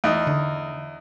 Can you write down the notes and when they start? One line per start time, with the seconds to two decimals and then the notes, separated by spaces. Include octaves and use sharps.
0.04 E2 D#4 D#5
0.27 D3